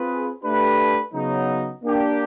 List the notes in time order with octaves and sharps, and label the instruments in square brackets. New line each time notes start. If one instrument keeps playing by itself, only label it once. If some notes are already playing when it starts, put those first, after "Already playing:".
Already playing: [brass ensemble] C4 F4 G#4 B4
A3 D4 G4 B4
C#3 F#3 B3 D#4
A#3 D4 G4